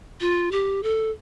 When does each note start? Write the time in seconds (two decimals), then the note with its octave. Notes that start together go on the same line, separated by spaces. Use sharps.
0.21 F4
0.52 G4
0.83 A4